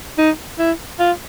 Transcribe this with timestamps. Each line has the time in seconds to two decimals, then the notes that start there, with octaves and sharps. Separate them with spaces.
0.18 D#4
0.59 E4
0.99 F4